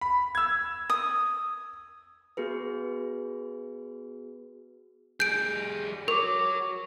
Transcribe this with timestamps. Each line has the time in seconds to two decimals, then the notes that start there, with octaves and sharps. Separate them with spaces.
0.01 B5
0.35 E6 G#6
0.90 D#6
2.37 B3 F#4 G#4 B4
5.20 G3 G#4 G6 D7
6.08 F#4 A#4 C#5 C#6 D6